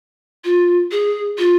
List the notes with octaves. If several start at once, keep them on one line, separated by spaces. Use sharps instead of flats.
F4
G#4
F4